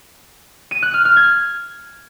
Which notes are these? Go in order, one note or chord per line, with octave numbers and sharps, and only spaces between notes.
D#7
F#6
F6
F6
G#6